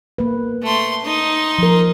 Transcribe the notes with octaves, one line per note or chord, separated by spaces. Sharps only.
A#3 B4
A3 C6
D#4 C6
F3 A#4